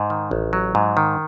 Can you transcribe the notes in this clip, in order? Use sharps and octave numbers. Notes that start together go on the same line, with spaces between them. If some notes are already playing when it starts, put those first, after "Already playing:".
Already playing: G#2
D#3
A1
F#3
G#2
D#3